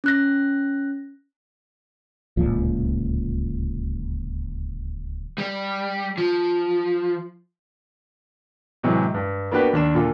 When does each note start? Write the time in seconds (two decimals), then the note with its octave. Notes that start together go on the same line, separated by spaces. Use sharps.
0.04 C#4 F#6 A#6
2.37 D1 C#2 A#2 F3
5.38 G3
6.18 F3
8.83 A2 C3 E3 F#3 G#3
9.14 G2
9.51 A#3 B3 D4 F#4 G4 B4
9.73 D#2 D4 E7
9.94 A#2 D3 F4